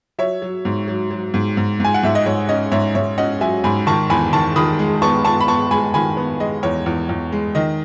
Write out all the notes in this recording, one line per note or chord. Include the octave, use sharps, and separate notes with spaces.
F#3 C#5 E5
F#3
G#2
F#3
F#3
G#2
G#2
G#2 G#5
F#5
G#2 E5
D#5
G#2 C#5
C#4 D#5
G#2 C#5 E5
G#2 C#5 E5
C#4 D#5 F#5
F#3 E5 G#5
G#2 G#5 B5
D#3 A5 C#6
E2 G#5 B5
D#3 A5 C#6
D#3 B5 D#6
G#3
B3 A5 C#6
B3 A5 C#6
B5
B3 A5 C#6
G#3 G#5 B5
D#3 G#5 B5
B3
G#3 D#5
E2 C#5
E2
E2
G#3
D#3 D#5